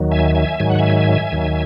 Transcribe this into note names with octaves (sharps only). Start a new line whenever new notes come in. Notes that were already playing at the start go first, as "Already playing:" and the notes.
Already playing: D#2 D#3 F#3
E5 G#5
E5 G#5
G#2 D#3 F#3 G#5
F#5
E5 G#5
D#2 D#3 F#3